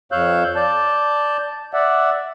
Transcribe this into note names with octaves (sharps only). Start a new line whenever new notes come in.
F2 C#5 F5 E6 F#6 G6
D5 A5 G6
D5 E5 F#5